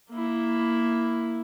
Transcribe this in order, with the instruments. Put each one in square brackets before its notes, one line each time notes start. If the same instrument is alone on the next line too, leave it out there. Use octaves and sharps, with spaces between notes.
[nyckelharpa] A#3 E4